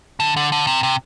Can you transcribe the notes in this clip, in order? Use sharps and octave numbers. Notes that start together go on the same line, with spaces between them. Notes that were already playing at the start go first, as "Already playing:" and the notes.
D3
D3
D3
C3
C3